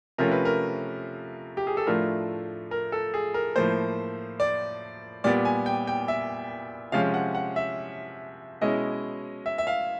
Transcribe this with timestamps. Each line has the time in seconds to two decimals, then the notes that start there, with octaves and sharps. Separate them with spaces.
0.18 C3 F3 A3 C#4 F4 A#4
0.31 B4
0.45 A#4
1.57 G4
1.67 G#4
1.77 A4
1.87 A2 F3 A3 D4 F4 A#4
2.71 A#4
2.92 A4
3.14 G#4
3.34 A#4
3.56 A2 F3 A#3 C5
4.40 D5
5.24 A#2 G3 B3 D5
5.45 G#5
5.66 G5
5.87 G5
6.08 E5
6.92 C3 F3 G#3 C#4 F5
7.14 F#5
7.35 F#5
7.56 E5
8.61 B2 G#3 C#4 E4 D#5
9.46 E5
9.58 E5
9.67 F5